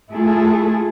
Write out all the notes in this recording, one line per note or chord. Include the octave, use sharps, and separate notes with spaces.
A3 E4 F4 G#4 A4